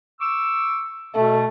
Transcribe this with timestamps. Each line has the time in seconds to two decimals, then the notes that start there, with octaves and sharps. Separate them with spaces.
0.21 C#6 D6 E6
1.15 B2 A3